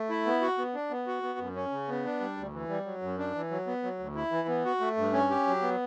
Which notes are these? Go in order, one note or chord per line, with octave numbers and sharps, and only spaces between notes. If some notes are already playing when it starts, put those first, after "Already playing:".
Already playing: A3
E4
B3
F#4
B3
D4
B3
F#4
B3
F#2
C#4
C#3
B3
D4
G3
D2
E3
G3
F#3
F#2
D4
E3
F#3
B3
F#3
D2
E4
E3
B3
F#4
A3
G2
C#4
G4
F#3
B3